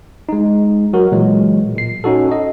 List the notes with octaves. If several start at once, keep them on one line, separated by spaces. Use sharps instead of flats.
G#3 D#4
F#3 F#4 A#4
A#2 E3 F#3 G#3
A#2 C7
C#4 D#4 F#4 A4
D#5